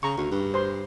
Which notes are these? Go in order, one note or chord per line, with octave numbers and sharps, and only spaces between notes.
C#3 A#5 C#6
D2
G2
C5 C6